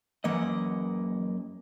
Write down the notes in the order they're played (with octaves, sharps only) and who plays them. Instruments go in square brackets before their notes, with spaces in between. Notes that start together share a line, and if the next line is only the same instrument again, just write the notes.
[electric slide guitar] F#2 A#3 D#5 [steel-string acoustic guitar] E3 F#5